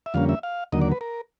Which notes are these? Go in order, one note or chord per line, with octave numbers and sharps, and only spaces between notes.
E5
F2 D3 G3 A#3 C#4 F5
E5
F5
D#2 D3 F#3 A#3 D#5
D5
B4
A#4